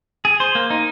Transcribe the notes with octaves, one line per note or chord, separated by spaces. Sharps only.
G#4
C5
A#3
D#4